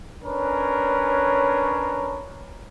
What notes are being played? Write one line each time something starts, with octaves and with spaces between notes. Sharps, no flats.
C#4 D4 A#4 B4 C#5